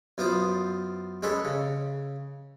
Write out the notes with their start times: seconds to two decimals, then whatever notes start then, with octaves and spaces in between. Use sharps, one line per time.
0.18 F#2 B3 F4 C5 D#6
1.23 G#3 C#4 G#4 A4 B4
1.45 C#3